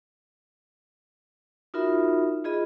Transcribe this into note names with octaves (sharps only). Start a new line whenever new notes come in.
D#4 F4 F#4 A#4 E5 B5
F4 G#4 D#5 B5